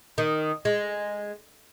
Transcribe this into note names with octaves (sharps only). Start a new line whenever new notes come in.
D#3
G#3